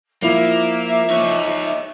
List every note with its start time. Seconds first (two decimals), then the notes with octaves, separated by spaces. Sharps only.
0.22 F3 A#3 E4 F4 E5
1.10 D#4 C#5